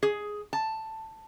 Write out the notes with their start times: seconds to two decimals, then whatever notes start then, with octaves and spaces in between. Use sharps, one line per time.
0.03 G#4
0.53 A5